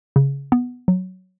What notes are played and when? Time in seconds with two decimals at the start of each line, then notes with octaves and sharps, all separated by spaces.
0.16 C#3
0.52 B3
0.88 F#3